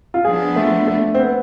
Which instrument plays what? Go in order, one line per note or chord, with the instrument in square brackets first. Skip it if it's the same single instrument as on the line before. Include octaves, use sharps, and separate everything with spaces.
[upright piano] F4
[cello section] F3 B3 D4 [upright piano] G#4
[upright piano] A3
A3
C4
B3